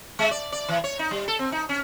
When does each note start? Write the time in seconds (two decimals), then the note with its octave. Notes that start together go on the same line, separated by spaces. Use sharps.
0.19 G#3
0.31 D5
0.52 D5
0.68 E3
0.84 C#5
0.99 D#4
1.11 G3
1.28 A4
1.39 C4
1.52 D#4
1.69 C#4